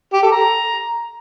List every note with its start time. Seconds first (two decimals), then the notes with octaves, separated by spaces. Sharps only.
0.13 G4
0.22 A4
0.32 A#5